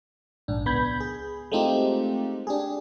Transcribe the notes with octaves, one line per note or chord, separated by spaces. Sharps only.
A#1 G#2 D4
C#2 B3 B5 G6 G#6
G#4
G#3 A3 C4 D#4 F4 G4
D4 G4 G#4